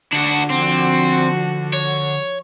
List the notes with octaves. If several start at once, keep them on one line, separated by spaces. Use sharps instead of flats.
D3 D4 F#4
F3 C4 F#4
C#5